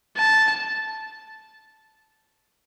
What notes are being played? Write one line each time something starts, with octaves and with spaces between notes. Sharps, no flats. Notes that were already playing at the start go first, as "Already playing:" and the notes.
A5